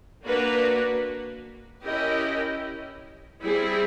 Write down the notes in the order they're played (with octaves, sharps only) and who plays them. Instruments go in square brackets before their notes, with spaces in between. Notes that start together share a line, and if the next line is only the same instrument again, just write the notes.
[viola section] A#3 D4 F#4 B4
C#4 E4 G4 A#4 D#5
G3 C4 E4 G#4